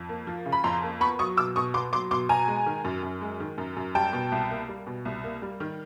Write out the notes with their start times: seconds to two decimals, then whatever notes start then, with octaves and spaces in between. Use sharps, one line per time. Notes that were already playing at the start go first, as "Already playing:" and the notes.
Already playing: F2
0.09 A#3
0.27 F3
0.46 C#3
0.52 B5
0.64 F2 A#5 C6
0.83 A#3
1.01 B3 B5 C#6
1.19 F#3 C#6 D#6
1.37 B2 D6 E6
1.56 B2 C#6 D#6
1.74 B3 C6 D6
1.92 F#3 C6 D6
2.11 B2 C6 D6
2.29 B2 G#5 A#5
2.48 G#3
2.66 D#3
2.85 F#2
3.03 F#2
3.21 G#3
3.40 D#3
3.58 F#2
3.77 F#2
3.95 G3 G5 A5
4.13 B2
4.32 C2
4.50 A#3
4.69 G3
4.87 B2
5.05 C2
5.24 A#3
5.42 G3
5.60 D#3